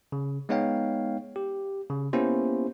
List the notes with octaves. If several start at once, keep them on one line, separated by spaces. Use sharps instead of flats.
C#3
G#3 B3 D#4 C#5 F5 G5
G4
C#3
A#3 B3 C#4 E4 G4 C5